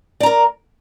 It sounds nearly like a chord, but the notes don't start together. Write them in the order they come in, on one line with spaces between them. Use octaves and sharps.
D5 A#5 A#4